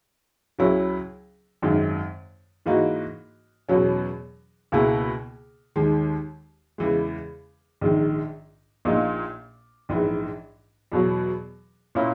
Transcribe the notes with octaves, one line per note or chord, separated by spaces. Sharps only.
C#2 C#3 F#3 C#4 E4
G#1 F#2 D#3 G#3
G#2 E3 A#3 D#4 F#4
E2 B2 F#3 C#4
C#2 B2 A#3 E4 G#4
D#2 D#3 G#3
E2 C#3 E3 G#3
A#1 G#2 D#3
A#1 A#2 A#3 D#4
A#1 G#2 E3
E2 B2 F#3
A#2 A#3 C#4 E4